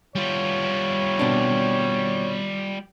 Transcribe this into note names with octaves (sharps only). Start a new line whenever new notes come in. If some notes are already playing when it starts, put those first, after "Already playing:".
G3 F4 C#5
B2 C4 D4